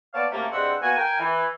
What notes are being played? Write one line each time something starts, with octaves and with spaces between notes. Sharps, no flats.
A#3 B3 C#5 D5 F5 A5
F#2 C3 A3 A#3
G2 G#3 C4 E5 F#5
A#3 B3 F#4 G#5
A#4 G5 G#5
E3